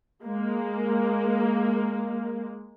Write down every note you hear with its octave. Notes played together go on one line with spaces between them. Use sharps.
G#3 A#3